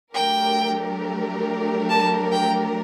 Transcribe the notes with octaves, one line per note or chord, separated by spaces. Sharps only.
F#3 A3 D4 G4 A#4 G5
A5
G5